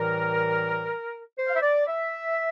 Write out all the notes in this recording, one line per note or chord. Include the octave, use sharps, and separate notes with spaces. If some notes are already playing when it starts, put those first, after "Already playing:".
Already playing: A2 E3 G3 A#4
C5
F5
E5
D5
E5